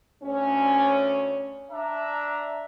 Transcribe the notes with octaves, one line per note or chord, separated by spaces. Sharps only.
D2 C#4
D4 E5 A#5